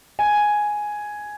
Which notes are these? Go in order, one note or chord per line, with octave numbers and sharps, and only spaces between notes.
G#5